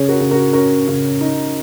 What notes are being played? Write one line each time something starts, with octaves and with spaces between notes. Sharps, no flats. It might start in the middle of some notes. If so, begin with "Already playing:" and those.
Already playing: C#3 G#4 C#5
F#4 A#4
C#3
F#4 A#4
C#4 F#4 A#4
C#3
D#4